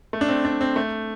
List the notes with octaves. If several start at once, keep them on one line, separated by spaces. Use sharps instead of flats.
A3
D4
C4
D4
C4
A3